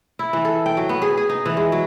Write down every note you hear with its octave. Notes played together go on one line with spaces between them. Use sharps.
E4
E3
A4
G5
F#3
B3
G#4
G#4
D#4
E3
G#3
F#3